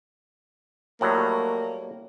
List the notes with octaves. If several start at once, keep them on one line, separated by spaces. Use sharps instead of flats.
A2 F#3 G3 A#3